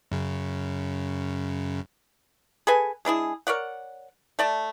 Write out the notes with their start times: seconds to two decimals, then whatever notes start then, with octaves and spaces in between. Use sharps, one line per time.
0.11 F#2 C#3
2.67 G#4 A4 B4 G#5
3.05 G#3 D4 E4 G#4
3.47 A#4 C#5 D5 F#5
4.39 A3 D5 A5